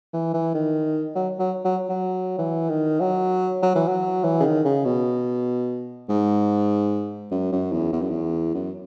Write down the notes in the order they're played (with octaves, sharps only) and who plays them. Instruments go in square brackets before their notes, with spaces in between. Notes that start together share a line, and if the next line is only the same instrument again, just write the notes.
[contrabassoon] E3
E3
D#3
F#3
F#3
F#3
F#3
E3
D#3
F#3
F#3
E3
F#3
E3
C#3
D#3
C#3
B2
G#2
F#2
F#2
E2
E2
F#2
E2
F#2